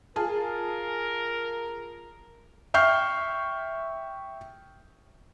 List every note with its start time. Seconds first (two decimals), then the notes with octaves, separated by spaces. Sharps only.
0.16 F4 G#4 A#4 A5
2.74 E5 G5 C#6 F6 G6 C7